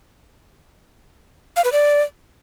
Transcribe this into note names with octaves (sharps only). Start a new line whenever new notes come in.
F5
B4
D5